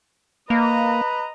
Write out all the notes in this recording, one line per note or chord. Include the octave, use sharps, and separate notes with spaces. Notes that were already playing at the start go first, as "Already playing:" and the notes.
A#3 B4 D#5 A#5